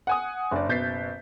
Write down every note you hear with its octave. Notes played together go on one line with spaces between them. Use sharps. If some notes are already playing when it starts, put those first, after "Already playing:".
F#5 G#5 D#6
F#1 C#4 D4 D5
F#1 B2 G6 A6 B6 C7